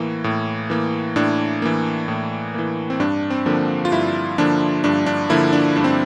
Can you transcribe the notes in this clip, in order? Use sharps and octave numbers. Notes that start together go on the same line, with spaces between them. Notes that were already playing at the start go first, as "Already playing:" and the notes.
Already playing: A2 E3 A#3
A2
E3 A#3
A2 D4
E3 A#3
A2
E3 A#3
C4
G2 D4
C4
D3 F3 A#3
F4
G2 E4
D3 F3 A#3 D4
G2 D4
D4
D3 F3 A#3 E4
D4
G2 D4
C4